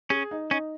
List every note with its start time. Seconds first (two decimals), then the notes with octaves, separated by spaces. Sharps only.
0.10 C#4 G#4
0.31 D#4
0.51 C#4 D#4